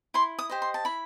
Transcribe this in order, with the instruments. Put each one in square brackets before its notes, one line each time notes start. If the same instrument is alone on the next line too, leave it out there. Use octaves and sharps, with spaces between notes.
[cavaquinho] E4 C6
D#6
G4 C5 D#5
C6
A5
E4 B5